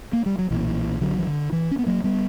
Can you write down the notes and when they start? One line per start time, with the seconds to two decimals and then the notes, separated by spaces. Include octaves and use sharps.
0.13 A#3
0.26 G3
0.38 F#3
0.51 B1 A#2 E3
1.01 D3 F#3
1.18 E3
1.27 D3
1.52 E3
1.71 C#4
1.79 B3
1.86 F#3 A#3
2.04 G3 B3